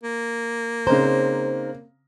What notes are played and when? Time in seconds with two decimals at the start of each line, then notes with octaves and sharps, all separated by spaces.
0.04 A#3
0.87 C#3 C4 D#4 C5 A#5